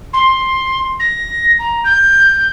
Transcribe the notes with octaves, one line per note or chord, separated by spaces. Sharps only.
C6
A#6
A#5
G6